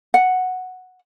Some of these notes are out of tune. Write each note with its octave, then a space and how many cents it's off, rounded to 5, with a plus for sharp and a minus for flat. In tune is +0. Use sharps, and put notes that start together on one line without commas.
F#5 -5